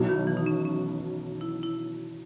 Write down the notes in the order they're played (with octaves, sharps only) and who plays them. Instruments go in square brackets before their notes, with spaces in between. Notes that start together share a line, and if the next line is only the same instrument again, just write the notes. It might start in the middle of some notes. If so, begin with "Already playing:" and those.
Already playing: [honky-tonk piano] B1 B2 F#3 B3 E4
[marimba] D#3
E3
D#4
C#4
C#4
E4
E4